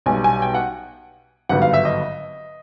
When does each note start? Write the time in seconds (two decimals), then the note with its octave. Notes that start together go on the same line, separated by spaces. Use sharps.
0.06 B1 B2 G3 G#5
0.24 G#5
0.42 G5
0.54 F#5
1.49 G#1 G2 D3 F#3 B3 F#5
1.62 F5
1.74 E5
1.85 D#5